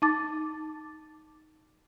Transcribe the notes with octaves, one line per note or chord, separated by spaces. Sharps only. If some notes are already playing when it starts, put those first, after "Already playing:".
D#4 A5 D6 A6